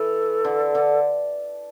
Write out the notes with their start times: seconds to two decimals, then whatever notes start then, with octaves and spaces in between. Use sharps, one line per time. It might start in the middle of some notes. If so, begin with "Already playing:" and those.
Already playing: E3 A4
0.44 D3
0.75 D3